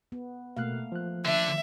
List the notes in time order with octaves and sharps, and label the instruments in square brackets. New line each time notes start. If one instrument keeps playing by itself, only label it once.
[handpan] B3
[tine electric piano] B2 F#6 [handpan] A3 A#3 F5
[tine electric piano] F3 F#6
[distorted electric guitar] D3 D4 [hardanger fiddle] E5